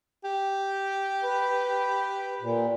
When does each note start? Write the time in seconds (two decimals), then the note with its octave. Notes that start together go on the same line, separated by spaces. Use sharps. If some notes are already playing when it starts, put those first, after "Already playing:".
0.24 G4
1.23 B4
2.41 A#2